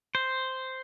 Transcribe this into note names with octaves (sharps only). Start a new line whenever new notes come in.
C5